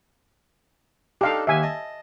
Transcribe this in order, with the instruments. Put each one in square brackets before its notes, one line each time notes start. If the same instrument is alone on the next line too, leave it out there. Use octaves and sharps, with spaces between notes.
[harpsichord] D4 D#4 A4 [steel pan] G4 F5
[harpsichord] D#2 [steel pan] E5 G#5
[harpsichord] D#5 A5